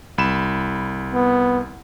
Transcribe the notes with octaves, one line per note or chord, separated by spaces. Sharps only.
C2 B5 E7
B3